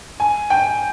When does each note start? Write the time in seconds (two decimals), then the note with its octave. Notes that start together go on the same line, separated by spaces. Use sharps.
0.20 G#5
0.50 G5